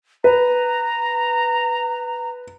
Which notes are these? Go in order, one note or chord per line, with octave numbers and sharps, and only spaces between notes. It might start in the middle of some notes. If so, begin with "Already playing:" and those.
B4 A#5